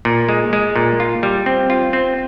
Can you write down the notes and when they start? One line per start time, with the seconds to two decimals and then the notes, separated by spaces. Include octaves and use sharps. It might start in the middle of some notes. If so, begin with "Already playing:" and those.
0.05 A#2
0.29 G#3
0.53 G#3
0.76 A#2
1.00 F4
1.23 G3
1.46 C4
1.70 F4
1.93 C4